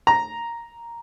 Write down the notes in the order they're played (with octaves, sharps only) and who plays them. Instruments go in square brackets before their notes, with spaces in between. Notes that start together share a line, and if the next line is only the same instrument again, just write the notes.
[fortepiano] A#5